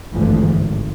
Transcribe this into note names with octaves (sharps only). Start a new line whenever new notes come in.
G#1 D2 G2 D3 E3 F3
G#1